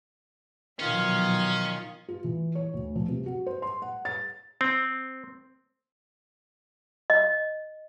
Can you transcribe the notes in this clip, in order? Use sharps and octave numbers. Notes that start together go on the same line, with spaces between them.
B2 D#3 F3 F#3 C#4 F4
F4
E3
C#5
D2
F3
C3
F#4
C5
C6
F#5
A6
C4
D#5